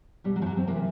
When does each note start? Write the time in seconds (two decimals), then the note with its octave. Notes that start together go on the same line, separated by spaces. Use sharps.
0.24 B2 G3
0.36 F#3
0.42 F3
0.46 F#3
0.57 C4
0.68 C3 E3 A#3